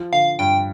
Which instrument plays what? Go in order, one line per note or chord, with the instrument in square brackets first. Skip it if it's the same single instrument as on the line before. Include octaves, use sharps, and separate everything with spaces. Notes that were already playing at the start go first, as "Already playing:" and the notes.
Already playing: [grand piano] F3
[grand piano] D3 [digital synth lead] F5
[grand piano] G2 [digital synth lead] G5